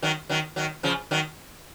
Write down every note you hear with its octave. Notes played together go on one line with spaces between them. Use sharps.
D#3 F#3
D#3 F#3
D#3 F#3
C#3 F3
D#3 F#3